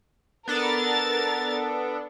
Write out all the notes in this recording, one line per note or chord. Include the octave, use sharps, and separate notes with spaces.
B3 D4 A4 A#4 A6